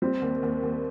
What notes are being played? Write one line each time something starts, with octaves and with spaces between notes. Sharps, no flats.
G3 C4
D#2
D#2
D#2